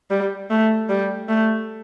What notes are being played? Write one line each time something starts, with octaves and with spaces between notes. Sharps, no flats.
G3
A3
G3
A3